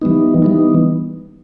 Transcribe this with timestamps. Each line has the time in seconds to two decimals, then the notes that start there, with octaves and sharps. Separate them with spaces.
0.02 E3 G3 B3 D#4
0.42 E3 G3 B3 D#4